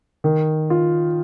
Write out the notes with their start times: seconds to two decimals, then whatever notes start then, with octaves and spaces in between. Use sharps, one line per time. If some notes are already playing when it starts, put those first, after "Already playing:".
0.24 D#3
0.70 F4